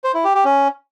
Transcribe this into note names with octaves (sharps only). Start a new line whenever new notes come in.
C5
E4
G4
G4
C#4